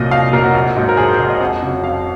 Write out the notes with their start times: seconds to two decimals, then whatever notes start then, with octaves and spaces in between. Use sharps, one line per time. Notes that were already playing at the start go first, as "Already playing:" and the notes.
Already playing: C2 A#2 F#3 D#5
0.11 C2 F5
0.33 A#2 F#3 A#4
0.44 F#4
0.54 A#1
0.76 G#2 F#3
0.89 A#4
0.97 A#1 G#4
1.09 C5
1.19 G#2 F#3
1.30 D#5
1.41 F2 F#5
1.62 C#3 F#3
1.83 F2 F5